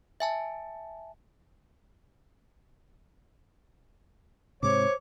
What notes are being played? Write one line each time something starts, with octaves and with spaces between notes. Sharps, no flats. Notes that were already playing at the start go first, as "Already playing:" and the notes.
E5 G#5 A5
G#2 C3 C5 C#5 D6